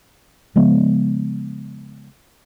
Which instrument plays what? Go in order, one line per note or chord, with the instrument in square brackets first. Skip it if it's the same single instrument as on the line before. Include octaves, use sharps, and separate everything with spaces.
[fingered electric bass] C#3 F3 G#3 B3